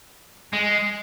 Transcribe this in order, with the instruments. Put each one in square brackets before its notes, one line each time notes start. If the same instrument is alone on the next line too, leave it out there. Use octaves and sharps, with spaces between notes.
[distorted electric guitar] G#3